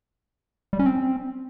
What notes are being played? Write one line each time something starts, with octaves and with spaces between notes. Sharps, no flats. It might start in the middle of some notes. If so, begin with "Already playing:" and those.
G3
C#4
C4